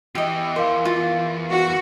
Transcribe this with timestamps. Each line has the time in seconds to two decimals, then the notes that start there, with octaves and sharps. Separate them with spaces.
0.15 E2 E3 G4 D#5
0.56 A#4 C5 F5
0.85 F4
1.49 F#4